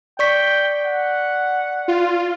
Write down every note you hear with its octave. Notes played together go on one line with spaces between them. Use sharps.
D5 G5 C#6 B6
F#5
F4